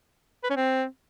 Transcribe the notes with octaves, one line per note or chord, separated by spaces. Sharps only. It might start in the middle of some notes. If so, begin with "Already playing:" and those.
B4
C#4
C4